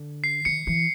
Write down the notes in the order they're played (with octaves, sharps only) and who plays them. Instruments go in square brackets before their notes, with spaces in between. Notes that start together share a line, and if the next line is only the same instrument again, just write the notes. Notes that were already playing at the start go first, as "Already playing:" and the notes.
Already playing: [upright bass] D3
[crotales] C7
[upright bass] D#3 [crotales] C#7
[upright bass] E3